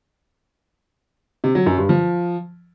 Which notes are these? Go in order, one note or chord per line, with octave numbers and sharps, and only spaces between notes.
C3
F#3
F#2
G2
F3